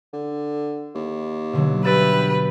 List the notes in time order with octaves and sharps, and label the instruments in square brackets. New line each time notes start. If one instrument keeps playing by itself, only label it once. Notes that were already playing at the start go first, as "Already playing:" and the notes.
[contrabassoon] D3
D#2
[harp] B2 D3 F#3
[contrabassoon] G2 [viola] G4 B4 [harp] E5 A6 D7